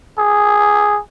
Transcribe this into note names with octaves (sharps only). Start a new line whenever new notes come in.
G#4